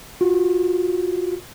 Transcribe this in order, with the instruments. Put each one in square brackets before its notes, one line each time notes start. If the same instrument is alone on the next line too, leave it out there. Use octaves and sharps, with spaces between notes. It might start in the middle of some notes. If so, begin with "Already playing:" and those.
[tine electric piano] F4 F#4